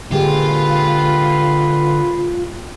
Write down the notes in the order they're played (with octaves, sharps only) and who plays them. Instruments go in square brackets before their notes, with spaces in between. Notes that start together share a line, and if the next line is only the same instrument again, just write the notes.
[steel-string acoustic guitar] A#2 G#3 G4 [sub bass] D3 [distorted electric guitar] F4 [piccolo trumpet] B4